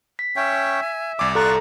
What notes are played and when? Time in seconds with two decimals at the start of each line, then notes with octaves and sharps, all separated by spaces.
0.19 B6
0.36 C#4 C#5 E5 G5
0.82 G#5
1.19 C2 D5 G#5 D6
1.35 F4 A4 D5 A#5 C#6 F#6